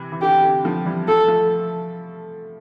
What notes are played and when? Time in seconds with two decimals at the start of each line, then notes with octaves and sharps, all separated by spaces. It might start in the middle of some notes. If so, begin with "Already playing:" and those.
Already playing: C3 E3
0.12 E3
0.22 D3 G4
0.43 D3
0.64 D3 F3
0.85 E3 G3
1.07 F3 A3 A4
1.28 F3 A3